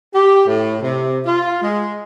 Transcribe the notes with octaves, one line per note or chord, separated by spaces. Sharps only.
G4
A2
C3
F4
G#3